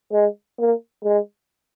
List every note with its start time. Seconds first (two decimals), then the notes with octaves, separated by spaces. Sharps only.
0.12 G#3
0.59 A#3
1.04 G#3